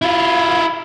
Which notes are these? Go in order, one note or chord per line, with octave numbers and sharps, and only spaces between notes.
E4 F4